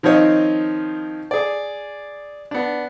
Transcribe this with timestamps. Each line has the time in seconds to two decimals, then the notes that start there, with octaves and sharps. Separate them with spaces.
0.03 D#3 F3 C4 C#5 D#5
1.31 G#4 D5
2.51 B3 D4